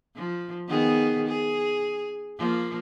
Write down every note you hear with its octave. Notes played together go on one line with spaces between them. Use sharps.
F3
D#3 B3 G#4
G#4
F3 A#3